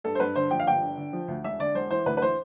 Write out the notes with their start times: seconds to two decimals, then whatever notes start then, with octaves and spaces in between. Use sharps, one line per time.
0.04 G2 A4
0.15 C5
0.20 G2 B4
0.36 D3 C5
0.51 F3 G5
0.59 F5
0.66 G1 G5
0.82 D3
0.97 D3
1.13 F3
1.28 D2
1.44 E1 E5
1.59 D3 D5
1.74 E1 C5
1.90 E3 C5
2.06 D2 B4
2.17 B4
2.22 E3 C5